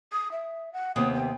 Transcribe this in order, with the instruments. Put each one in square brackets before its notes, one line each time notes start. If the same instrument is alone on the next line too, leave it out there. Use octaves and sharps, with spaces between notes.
[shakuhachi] D#6
E5
F#5
[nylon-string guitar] D#2 C3 B3 [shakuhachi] D#6
[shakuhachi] G5